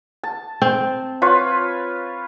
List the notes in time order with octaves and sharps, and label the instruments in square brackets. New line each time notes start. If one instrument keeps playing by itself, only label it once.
[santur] A5
[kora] C4
[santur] F4 B4 C#5